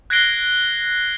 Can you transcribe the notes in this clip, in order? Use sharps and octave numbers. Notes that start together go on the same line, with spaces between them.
F#6 G#6 A#6 C7 D7 G7